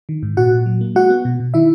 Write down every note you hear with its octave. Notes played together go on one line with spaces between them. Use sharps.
D#3
G#2
A#2 F#4 F#5
A#2
F#3
A#3
G#3 F#4 F#5
B3
B2
B2
D#3 E4 E5